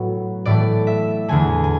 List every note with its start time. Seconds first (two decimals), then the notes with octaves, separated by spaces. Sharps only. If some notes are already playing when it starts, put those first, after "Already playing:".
Already playing: A2 F#3 B3
0.45 A2 E3 A3 D5
0.87 E5
1.28 E2 D3 A3 G#5
1.64 G#5